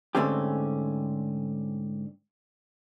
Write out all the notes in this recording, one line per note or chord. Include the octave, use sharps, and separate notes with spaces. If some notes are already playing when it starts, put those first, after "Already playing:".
G#2 D3 A3 C4 C#4 G4